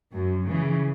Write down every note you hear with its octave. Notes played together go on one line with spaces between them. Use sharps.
F#2
C#3 E3